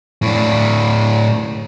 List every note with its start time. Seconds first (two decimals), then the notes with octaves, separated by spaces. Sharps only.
0.22 A2 D4